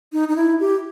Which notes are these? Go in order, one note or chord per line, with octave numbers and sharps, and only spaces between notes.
D#4
D#4
E4
G4